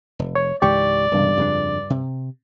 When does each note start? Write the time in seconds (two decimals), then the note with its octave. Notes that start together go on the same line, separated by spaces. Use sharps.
0.19 F1
0.35 C#5
0.62 C#2 G#2 E3 G4 D5 C#6
1.12 E1 C#2 G2 C3
1.37 F2 C#3 D4
1.90 C3